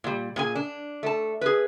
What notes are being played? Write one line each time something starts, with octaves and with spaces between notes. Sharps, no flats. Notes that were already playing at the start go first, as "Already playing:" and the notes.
A#2 G3
A#2 G#4 G#5
D4
A3 A5
G#4 B4